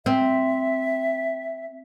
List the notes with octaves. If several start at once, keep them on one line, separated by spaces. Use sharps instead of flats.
C4 E5